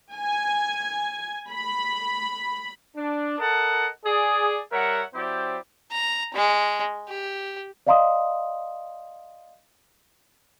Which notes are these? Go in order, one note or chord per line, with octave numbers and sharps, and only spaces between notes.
G#5
B5
D4
A4 A#4 D#5 F#5 A5
G#4 D5
G3 A#4 C#5 E5 F#5
F#3 C4 E4 G4 C5 D5
A#5
G#3
G4
D5 D#5 F5 A#5 C6 D#6